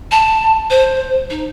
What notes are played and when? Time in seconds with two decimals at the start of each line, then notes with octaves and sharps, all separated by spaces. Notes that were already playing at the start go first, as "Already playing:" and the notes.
0.12 A5
0.70 C5
1.30 D#4